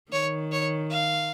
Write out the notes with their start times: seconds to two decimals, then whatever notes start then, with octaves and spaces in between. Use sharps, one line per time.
0.12 D#3 C#5
0.52 C#5
0.90 F5